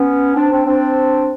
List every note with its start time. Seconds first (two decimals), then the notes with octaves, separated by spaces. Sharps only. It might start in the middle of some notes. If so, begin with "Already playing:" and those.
Already playing: B3 C#4
0.35 C4 D4
0.50 C4 D4
0.66 C4 D4